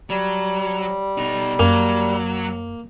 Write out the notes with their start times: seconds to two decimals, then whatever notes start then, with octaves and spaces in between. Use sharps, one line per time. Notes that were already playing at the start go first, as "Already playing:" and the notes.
0.10 F#3 G3
1.18 B2 D#4
1.59 F#2 F#3 A#3